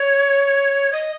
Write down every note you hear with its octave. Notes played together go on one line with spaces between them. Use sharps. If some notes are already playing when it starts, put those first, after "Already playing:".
Already playing: C#5
D#5